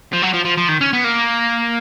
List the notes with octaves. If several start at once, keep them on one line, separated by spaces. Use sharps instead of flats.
F3
F#3
F3
F3
F3
D#3
C#4
B3
A#3